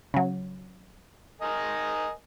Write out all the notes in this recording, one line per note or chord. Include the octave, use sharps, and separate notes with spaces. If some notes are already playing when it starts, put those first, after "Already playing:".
C#3 F#3
A#4 D#5 G#5